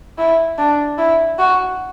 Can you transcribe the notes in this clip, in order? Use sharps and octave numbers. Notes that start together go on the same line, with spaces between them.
E4
D4
E4
F#4